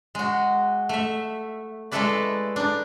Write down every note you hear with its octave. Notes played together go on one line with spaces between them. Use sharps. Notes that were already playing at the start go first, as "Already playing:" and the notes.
G#3 F#4
A3 E5
G#3 A3 E4 A4 B4 D5
D4 D#4